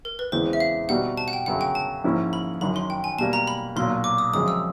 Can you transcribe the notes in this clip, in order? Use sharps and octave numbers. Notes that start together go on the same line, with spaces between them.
A#4
B4
E2 C#3 E3 G#3 C4 C5
E5
F5
B2 G3 C4 D#4 F#4 F#5
A5
F#5
G5
G1 F#2 C#3 F#3 F#5
G5
A5
G#2 F3 A#3 C#4 E4
B5
F#1 F#2 D#3 B5
C6
G5
G#5
B2 G3 A#3 A5
A#5
B5
B1 A#2 F#3 A#3 C6
D6
D#6
F#2 C#3 F3 G#3 C4 D#6
E6